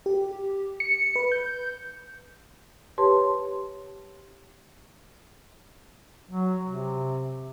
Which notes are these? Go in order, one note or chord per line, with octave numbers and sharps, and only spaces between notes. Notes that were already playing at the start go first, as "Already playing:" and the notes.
G4
C#7
B4
G6
G4 B4 C#5 A5 C6
F#3
C3